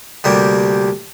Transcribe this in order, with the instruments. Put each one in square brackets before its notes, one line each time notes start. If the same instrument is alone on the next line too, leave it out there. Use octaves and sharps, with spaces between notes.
[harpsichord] D2 C3 G3 A#3